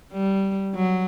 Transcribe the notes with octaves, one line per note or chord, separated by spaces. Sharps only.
G3
F#3